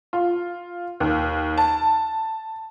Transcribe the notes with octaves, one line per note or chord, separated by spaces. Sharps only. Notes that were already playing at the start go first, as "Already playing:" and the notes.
F4
D#2
A5